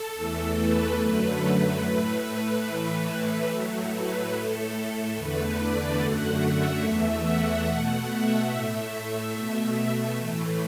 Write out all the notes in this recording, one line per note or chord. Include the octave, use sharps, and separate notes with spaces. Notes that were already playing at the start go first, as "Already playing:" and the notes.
Already playing: A4
E2 E3 A3
B4
F#2 D3 F#3 A3
B4
A2 A3 B4
B4
A2 E3 A3 B4
A2 F#3 A3
B4
A2 A3 A4
E2 D3 A3 B4
D5
F#2 D3 F#3 A3 F#5
E5
E2 E3 A3
F#5
B2 A3
E5
A2 A3
E5
B2 A3
A2 E3 A3